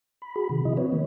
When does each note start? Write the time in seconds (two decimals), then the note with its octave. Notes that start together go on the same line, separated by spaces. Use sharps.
0.22 B5
0.36 F#4 G#4 B5
0.49 C3 D#3
0.65 C3 F3 E4 D#5
0.77 C4 F#4 B4 C#5
0.92 D#3 A#3